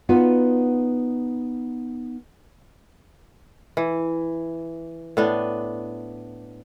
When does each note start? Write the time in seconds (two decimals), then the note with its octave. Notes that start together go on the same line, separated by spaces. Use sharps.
0.09 B3 D#4 F4 F#4 B4 D5
3.77 E3
5.17 A2 B3 D4